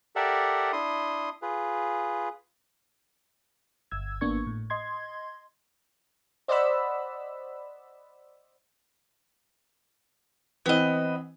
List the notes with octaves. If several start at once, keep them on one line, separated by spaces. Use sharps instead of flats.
G4 A4 A#4 D5 E5 F#5
D4 E4 C6 D#6
F4 G#4 B4
G1 E6 G#6
G#1 A#3 B3 D4 C#6 G#6
A2
D#5 C6 G#6
C5 D5 D#5 F#5 B5 E6
E3 B3 C4 D#5